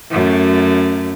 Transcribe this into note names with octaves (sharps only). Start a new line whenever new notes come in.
F#2 A3